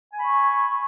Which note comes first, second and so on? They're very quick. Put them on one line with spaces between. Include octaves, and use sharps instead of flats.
G#5 B5 C#6